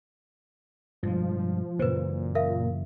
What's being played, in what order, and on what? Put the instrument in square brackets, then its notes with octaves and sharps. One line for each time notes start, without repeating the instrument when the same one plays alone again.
[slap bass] G2 B2 G#3 [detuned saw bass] F3
[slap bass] F#2 C#3 E3 [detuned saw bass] A#2 [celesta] B4 C5
[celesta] A#4 E5 F5